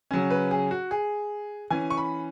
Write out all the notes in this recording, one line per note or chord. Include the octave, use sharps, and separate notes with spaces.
C#3 F#3 C#4
B4
G#4
F#4
G#4
E3 C#4 G#5
C#6
B5